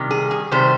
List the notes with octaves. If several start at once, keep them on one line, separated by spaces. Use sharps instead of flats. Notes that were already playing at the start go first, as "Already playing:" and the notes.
Already playing: C3 D#3 G3
G#4
G#4
C3 D#3 G3 C5